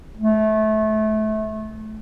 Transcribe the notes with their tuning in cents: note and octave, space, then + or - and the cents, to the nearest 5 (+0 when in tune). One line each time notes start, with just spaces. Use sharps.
A3 -25